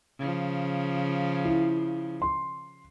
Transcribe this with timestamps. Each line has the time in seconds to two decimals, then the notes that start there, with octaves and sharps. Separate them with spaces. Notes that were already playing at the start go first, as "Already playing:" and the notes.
0.19 C#3 F3
1.45 E4
2.22 C6